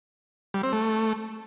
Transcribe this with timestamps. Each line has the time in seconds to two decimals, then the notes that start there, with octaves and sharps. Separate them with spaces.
0.54 G3
0.63 C4
0.73 A3